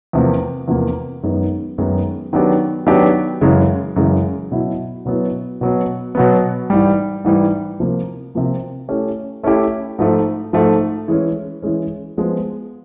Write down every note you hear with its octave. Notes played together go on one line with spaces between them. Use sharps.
E2 C3 F3 A#3
E2 C3 F3 A#3
F#2 D#3 G#3 B3 D#4
F#2 D#3 G#3 B3 D#4
D#3 F#3 B3 D4 G4
D#3 F#3 B3 D4 G4
F#2 C#3 E3 G#3
F#2 C#3 E3 G#3
B2 F#3 B3 E4
B2 F#3 B3 E4
B2 F#3 B3
B2 F#3 B3
G#2 E3 G3
G#2 E3 G3
C3 F3 A#3
C3 F3 A#3
A3 C#4 E4 G4
A3 C#4 E4 G4
G#2 F3 A3
G#2 F3 A3
E3 G#3 C#4
E3 G#3 C#4
F3 G#3 B3